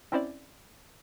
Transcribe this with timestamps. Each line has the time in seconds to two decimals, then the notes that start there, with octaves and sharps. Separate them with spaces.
0.12 C4 C#4 E4 C5 D5